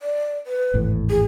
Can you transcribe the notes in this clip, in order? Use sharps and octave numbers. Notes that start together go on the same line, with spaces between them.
D5
B4
G#1 E2 A2
G#4